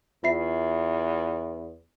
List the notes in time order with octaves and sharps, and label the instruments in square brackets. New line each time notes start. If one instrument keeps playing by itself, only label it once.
[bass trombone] E2 [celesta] F4 E5 C7